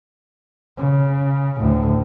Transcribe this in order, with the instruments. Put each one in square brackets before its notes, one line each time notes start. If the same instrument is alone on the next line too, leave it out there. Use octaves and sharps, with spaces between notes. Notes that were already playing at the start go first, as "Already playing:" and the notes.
[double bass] C#3
D2 A2